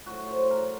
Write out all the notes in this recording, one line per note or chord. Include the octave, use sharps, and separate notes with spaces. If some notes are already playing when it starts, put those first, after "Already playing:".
A2 F#3 F#4
C5
A#4